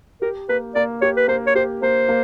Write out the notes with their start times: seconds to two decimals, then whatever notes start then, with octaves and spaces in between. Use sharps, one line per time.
0.22 G4 A#4
0.49 A#3 B4
0.75 A#3 D5
1.01 G4 C#5
1.17 B4
1.28 A#3 C5
1.47 C#5
1.55 G4 C5
1.82 A#3 C5
2.09 A#3